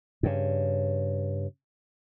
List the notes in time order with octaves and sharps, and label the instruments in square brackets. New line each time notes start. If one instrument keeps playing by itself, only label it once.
[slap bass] G2 C#3